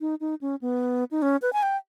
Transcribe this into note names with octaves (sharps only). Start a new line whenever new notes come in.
D#4
D#4
C#4
B3
D#4
C#4
B4
G#5
G5